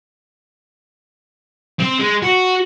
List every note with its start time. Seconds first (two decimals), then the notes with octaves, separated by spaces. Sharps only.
1.79 C4
1.99 G#3
2.22 F#4